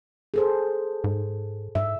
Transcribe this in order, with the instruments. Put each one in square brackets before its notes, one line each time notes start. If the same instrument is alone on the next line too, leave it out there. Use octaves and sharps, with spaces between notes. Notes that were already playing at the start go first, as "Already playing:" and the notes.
[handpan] G#4 A4 C5
[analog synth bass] G#2
[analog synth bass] G#2 [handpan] E5